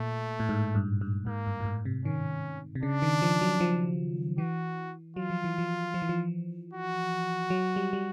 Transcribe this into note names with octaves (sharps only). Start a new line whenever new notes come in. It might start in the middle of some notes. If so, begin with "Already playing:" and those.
Already playing: A#2 A3
A2
G#2
G2
G2
G#2 A#3
G2
A2
G#2
C3
D#3 C#4
C3
C#3 D4
D#3
F3
F#3
F3
E3 F#4
F#3 F4
F3
E3
F3
F3
E3
F3
F#4
F#3
G3
G3